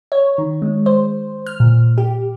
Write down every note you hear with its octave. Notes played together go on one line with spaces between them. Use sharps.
C#5
D#3
G#3
C5
F6
A#2
G4